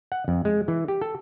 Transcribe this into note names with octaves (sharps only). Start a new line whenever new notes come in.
F#5
F2
G#3
E3
G4
A4